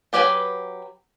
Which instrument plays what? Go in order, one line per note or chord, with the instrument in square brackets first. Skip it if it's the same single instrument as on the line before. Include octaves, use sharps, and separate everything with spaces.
[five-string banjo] F#3 G4 B4 G5 G#5